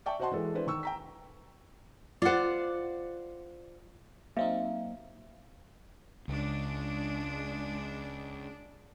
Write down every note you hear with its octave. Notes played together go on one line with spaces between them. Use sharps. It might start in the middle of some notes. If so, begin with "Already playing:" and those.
D5 E5 G5 A5 C#6
F#4 C5 D#5 F#5 A5 C6
E3 G#3 A4
D4 E4 B4 C5
D#3 C#6 E6
G5 A#5 B6
F4 C5 D5 F#5
F#3 A#3 C4 D#4 E5 F5
C#2 G#3 D4